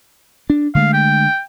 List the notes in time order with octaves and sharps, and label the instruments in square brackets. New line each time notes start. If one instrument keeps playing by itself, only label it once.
[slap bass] D4
[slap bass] D3 G#3 A3 [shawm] F5
[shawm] G5